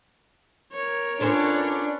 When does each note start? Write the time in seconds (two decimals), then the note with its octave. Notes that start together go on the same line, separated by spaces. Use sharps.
0.72 A#4 C#5
1.20 C#4 D4 F4 A4 B4 C5 D5